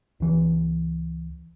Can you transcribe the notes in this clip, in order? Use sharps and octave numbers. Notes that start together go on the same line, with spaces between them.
C#2 E3